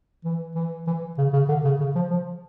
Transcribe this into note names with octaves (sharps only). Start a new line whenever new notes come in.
E3
E3
E3
C#3
C#3
D3
C#3
C#3
F3
F3